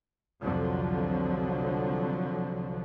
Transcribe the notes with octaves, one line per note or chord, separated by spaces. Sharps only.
C2 F2 D3 F3 F#3